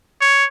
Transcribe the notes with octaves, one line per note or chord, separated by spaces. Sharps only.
C#5